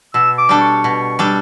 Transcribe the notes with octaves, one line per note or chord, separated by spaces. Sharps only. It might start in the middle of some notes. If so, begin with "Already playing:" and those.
B2 E6
D6
G3 D4 A4
C#6
B2
G3 D4 A4